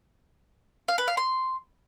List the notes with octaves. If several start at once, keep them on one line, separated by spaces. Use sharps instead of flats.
F5
B4
F5
C6